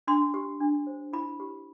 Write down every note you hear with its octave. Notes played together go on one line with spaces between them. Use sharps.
D4 C6
G4
D4
C5
E4 B5
G4